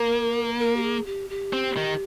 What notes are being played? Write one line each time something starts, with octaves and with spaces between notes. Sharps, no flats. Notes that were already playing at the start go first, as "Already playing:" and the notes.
Already playing: A#3 A#4
A#4
G4
G#4
G4
G4
C4
D#3